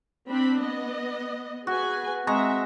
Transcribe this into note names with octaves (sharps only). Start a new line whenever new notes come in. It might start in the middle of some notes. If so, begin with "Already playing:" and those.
C4 D4 B5
B3 D#5
F#4 G#4 B4 G#5
G#3 C4 E5 A#5 C#6